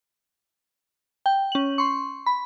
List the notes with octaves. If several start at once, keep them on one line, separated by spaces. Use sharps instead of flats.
G5
C#4 F#7
C6 C#6
B5